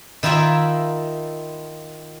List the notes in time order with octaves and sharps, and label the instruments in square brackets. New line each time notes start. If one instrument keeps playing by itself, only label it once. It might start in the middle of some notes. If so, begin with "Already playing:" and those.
[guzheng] D#3 E4 F4 A#4 E5